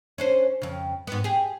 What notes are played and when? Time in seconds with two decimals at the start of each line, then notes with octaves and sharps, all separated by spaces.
0.18 C#4 D4 C5
0.62 F2 C#3
1.07 G#2 B3
1.24 G4 G#4